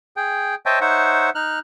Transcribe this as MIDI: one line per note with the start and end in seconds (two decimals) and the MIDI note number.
0.17 0.55 68
0.17 0.55 79
0.66 0.79 72
0.66 0.79 73
0.66 0.79 75
0.66 0.79 76
0.66 0.79 79
0.66 0.79 81
0.81 1.30 63
0.81 1.30 72
0.81 1.30 73
0.81 1.30 76
0.81 1.30 78
1.35 1.59 63
1.35 1.59 89
1.35 1.59 90